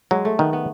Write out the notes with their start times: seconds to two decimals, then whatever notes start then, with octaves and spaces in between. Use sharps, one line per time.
0.11 F#3 G#3
0.25 A3
0.39 D#3 B3
0.53 B3